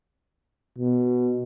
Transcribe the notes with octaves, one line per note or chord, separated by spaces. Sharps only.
B2